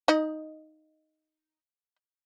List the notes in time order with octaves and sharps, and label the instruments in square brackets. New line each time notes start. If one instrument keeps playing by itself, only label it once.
[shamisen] D#4 D#5